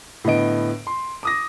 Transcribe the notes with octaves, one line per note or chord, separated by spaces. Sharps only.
A2 D3 B3 D#5 D7
C6
D6 D#6 A#6